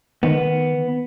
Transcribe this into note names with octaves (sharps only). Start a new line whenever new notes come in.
D#3 B3